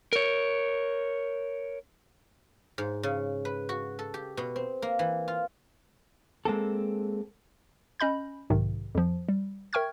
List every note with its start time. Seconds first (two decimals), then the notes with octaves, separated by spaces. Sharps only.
0.13 A#4 C#5
2.78 G#2
3.03 C#3
3.45 B4
3.69 F#4
3.99 A4
4.14 G4
4.37 B2
4.56 C4
4.82 A#3
4.99 E3
5.28 F4
6.45 G#3 A#3 C4 A4
8.00 C#4 D#5 B5 G6
8.50 B1 G#2 C3 D#3
8.95 F2 F3
9.29 G3
9.73 A#4 E5 G5 C#6 F6 G#6